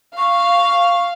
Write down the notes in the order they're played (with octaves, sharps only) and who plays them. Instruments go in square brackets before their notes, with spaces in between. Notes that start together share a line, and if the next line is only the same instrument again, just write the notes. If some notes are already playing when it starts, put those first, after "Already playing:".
[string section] F5 [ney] C#6